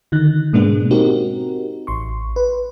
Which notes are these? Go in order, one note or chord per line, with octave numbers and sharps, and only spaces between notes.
D3 D#3 D#4 F#6
G#2 B2 G#3 A#3 B3 D4
C4 D#4 F#4 G4 A#4
A1 C6 C#6
B4